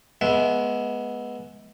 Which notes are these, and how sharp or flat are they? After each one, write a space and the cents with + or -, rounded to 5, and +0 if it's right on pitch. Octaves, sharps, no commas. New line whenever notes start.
G#3 +20 B3 -10 E5 +0